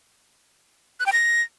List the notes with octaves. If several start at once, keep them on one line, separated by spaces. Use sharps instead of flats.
F#6
G5
A#6